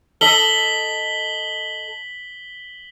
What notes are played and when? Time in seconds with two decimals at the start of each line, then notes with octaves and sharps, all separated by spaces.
0.21 A4 D#5 B6 F#7 G7